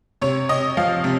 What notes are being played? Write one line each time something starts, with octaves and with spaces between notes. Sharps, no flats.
C3 C#5
C3 D#5
F3 F5
C3